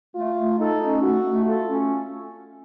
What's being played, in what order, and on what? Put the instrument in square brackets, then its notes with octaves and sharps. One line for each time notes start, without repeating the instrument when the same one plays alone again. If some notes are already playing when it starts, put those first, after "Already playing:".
[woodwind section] A3 [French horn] F4
[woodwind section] A3
[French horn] D#4 [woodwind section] A4
[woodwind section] C#4
[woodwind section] A3 [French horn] F#4
[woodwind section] A3
[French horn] F4 [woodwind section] A4
[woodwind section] C#4